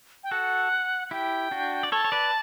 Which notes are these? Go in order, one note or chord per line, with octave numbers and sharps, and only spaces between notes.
G5
F#4 A4 F#5
E4 G4 G5
D4 F#4
D5
A4 C#5 A5
C#5
B4 D5